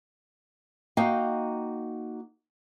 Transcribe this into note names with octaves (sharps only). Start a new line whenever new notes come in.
A#3 D#4 F#4 D#5 F5 G5